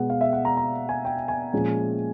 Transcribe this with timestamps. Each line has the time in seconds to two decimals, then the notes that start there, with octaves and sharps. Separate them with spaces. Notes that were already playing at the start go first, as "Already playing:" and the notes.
Already playing: B2 G#3 B3 F#5
0.10 F5
0.21 E5
0.33 F#5
0.45 A#5
0.57 A#5
0.89 G#5
1.05 G5
1.28 G#5
1.53 A#2 F3 G#3 C#4